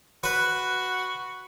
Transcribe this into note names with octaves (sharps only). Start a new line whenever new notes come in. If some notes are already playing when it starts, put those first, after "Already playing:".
F#4 B4